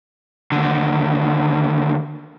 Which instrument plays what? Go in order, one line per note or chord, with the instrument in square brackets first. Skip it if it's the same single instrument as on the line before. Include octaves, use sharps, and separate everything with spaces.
[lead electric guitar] D#2 D3